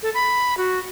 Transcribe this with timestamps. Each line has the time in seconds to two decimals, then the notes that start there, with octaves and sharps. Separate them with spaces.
0.03 A4
0.14 B5
0.57 F#4